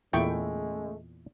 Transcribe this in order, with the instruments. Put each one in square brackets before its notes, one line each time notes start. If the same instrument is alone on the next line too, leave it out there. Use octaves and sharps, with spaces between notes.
[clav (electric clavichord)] E2 A#2 [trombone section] C#3 G#3 A3 [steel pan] E4 G5 C#6